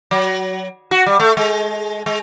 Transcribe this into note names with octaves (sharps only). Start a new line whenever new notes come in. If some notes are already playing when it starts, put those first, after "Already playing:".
F#3
F#4
G3
A3
G#3
G#3